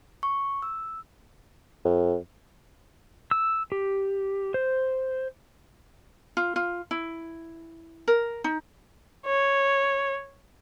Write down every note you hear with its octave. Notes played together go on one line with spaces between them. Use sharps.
C#6
E6
F2
E6
G4
C5
F4
F4
E4
A#4
D#4
C#5